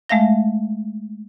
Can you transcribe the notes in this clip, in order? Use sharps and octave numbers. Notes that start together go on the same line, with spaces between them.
G#3 A3 E5 F5 A#6